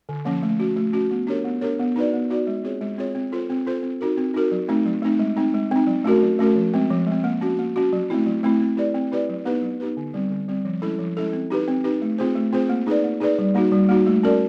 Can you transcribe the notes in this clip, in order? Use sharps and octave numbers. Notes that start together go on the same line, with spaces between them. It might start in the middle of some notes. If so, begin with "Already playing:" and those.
D3
F3 A#3 C#4
A3
C#4 F#4
A3
C#4 F#4
B3
D4 G4 A#4 C#5
B3
D4 G4 A#4 C#5
B3
D#4 F#4 B4 D5
B3
D#4 F#4 B4 D5
G#3
C4 F4 G#4 C#5
G#3
C4 F4 G#4 C#5
C4
F4 A4 C5
C4
F4 A4 C5
C4
D#4 F#4 A#4
C4
D#4 F#4 A#4
F#3
A3 C4 D#4
F#3
A3 C4 D#4
G#3
C4 D#4
G#3
C4 D#4
F#3
A3 C#4 F#4 A#4
F#3
A3 C#4 F#4 A#4
F3
G#3 C4
F3
G#3 C4
A#3
C#4 F#4
A#3
C#4 F#4
F#3
A3 C4 E4
F#3
A3 C4 E4
C4
E4 G4 B4 D5
C4
E4 G4 B4 D5
F#3
B3 D#4 G4 B4
F#3
B3 D#4 G4 B4
D3
G3 C4
D3
G3 C4
F3
G#3 C#4 E4 A4
F3
G#3 C#4 E4 A4
C4
D#4 G4 B4
C4
D#4 G4 B4
A3
C4 F4 G#4 C5
A3
C4 F4 G#4 C5
A#3
D#4 G#4 B4 D5
A#3
D#4 G#4 B4 D5
G3
A#3 D#4 F#4
G3
A#3 D#4 F#4
A3
C#4 F#4 A#4 D5